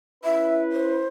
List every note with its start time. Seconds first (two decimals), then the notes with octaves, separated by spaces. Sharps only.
0.24 C#4 E4 B4 E5
0.72 C5